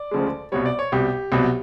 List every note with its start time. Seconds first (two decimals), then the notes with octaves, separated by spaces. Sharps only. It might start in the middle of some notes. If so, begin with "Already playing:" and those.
Already playing: D5
0.11 D2 C#3 F3 G#3
0.52 C2 B2 G3 C#5
0.66 D5
0.79 C#5
0.92 C2 B2 G3 G4
1.32 C2 B2 F#3